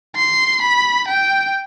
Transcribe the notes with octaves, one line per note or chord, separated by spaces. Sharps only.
C6
B5
G5